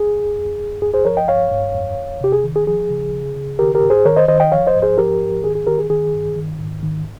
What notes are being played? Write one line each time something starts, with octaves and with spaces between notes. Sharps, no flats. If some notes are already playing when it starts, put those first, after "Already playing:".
Already playing: G#4
F2
F2
F2
G2 G#4
G#4 C5
F3 A#4 C#5
D#5 G5
G2 C#5 F5
G2
F2
F2
C3 G4
G#4
D#3
G#4
F3 G#4
C#3
C#3
C#3
D#3 G4 A#4
G4 A#4
G#2
G#4 C5
D#3 A#4 C#5
C5 D#5
D#3 C5 D#5
D#5 G5
F3 C#5 F5
C5 D#5
G#2
G#4 C5
F3 G4 A#4
G#2
D#3 G#4
G#4
D#3 G4 A#4
G#4
D#3 G#4
G2
D#3
G#2
D#3